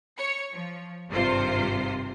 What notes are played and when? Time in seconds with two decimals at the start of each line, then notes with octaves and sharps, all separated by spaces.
0.17 C#5 C#7
0.53 F3
1.09 G#1 G2 C3 F4 C5 C7